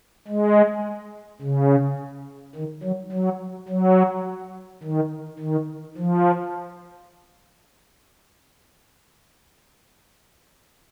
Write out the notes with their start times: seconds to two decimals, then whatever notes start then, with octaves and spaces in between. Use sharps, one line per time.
0.28 G#3
1.41 C#3
2.55 D#3
2.83 F#3
3.12 F#3
3.68 F#3
4.83 D#3
5.39 D#3
5.97 F3